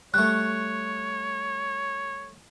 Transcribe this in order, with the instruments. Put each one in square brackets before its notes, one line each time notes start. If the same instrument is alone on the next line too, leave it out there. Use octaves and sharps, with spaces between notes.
[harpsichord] G3 A3 [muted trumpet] C#5 [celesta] F#6